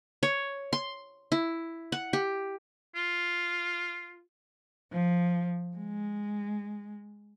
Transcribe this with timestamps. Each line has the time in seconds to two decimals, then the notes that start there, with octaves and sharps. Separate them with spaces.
0.23 C#5
0.73 C6
1.32 E4
1.92 F#5
2.13 G4
2.95 F4
4.92 F3
5.77 G#3